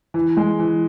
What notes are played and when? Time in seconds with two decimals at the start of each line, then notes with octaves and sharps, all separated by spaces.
0.14 E3
0.37 G#3
0.59 E3